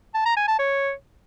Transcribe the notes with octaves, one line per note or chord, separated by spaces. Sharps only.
A5
A#5
G#5
A5
C#5